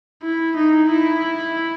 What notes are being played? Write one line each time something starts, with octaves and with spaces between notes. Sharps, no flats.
E4
D#4
E4